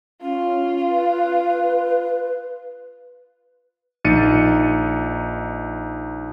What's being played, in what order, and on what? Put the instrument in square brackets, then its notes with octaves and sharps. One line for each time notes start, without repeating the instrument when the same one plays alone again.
[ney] C#4 [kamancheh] F4
[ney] B4
[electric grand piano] A#1 D#4 A6 C#7 D#7